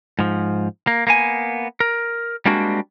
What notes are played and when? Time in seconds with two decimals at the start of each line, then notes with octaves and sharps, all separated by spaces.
0.19 G#2 F3
0.87 A#3
1.07 A#3 B3 G#5
1.80 A#4
2.46 G3 G#3 A#3 C4 D4 F#4